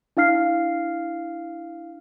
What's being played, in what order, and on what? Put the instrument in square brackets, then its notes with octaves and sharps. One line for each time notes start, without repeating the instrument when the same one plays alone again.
[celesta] D4 E4 F5 F6 C7